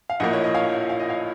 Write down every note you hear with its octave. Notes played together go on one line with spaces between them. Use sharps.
F5
A#1 A2 F3 A#3 D#5 F#5
C#5
D#5
C#5 F5
F5
D#5
C#5 F5